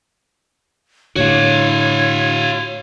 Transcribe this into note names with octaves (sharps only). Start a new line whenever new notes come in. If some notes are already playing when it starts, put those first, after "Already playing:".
A2 D3 F#4 C#5 F5